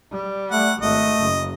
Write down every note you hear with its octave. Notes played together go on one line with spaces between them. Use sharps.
G3
A3 F#5
G#1 A3 D#5
F#1 C#3